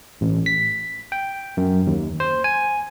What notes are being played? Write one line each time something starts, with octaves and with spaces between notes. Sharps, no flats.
A1
B6
G5
F#2
D#2
C5
G#5